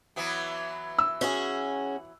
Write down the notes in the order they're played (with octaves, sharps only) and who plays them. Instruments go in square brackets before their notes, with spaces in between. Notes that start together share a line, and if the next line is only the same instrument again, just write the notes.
[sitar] E3 F#3 B3
[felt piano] E6
[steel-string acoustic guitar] C#4 F#4 G#4